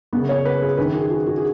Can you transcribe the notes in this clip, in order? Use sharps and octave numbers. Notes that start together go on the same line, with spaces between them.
F#2 C#3 B3
C#5
B4
G#4
F#2 D#3 B4
G#4
F#4
F#4
G#4